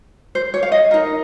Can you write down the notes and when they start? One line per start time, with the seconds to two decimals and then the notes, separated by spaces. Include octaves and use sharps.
0.35 C5
0.54 C#5
0.63 F5
0.72 D#5
0.91 D#4 A#4